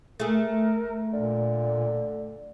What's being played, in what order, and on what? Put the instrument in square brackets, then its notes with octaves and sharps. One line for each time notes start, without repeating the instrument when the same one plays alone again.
[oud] A3 G#4 [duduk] A#4
[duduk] A#2 [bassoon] D3